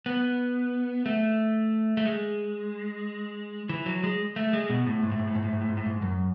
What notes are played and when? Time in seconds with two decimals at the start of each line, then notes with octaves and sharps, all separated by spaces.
0.06 B3
1.06 A3
1.97 A3
2.05 G#3
3.69 E3
3.86 F#3
4.04 G#3
4.36 A3
4.53 G#3
4.70 B2
4.87 A2
5.03 G#2
5.11 A2
5.19 G#2
5.28 A2
5.35 G#2
5.44 A2
5.53 G#2
5.61 A2
5.69 G#2
5.77 A2
5.86 G#2
6.02 F#2